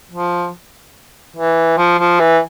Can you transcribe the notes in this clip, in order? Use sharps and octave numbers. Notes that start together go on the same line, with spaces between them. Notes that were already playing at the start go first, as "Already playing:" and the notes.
F3
E3
F3
F3
E3